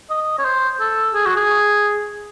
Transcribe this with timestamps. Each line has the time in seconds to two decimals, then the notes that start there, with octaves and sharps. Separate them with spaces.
0.10 D#5
0.38 C#5
0.45 C5
0.80 A4
1.14 G#4
1.26 F#4
1.37 G#4